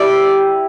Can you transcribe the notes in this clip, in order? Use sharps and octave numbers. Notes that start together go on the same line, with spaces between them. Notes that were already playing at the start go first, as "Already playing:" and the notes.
Already playing: G3 E4 A4 D5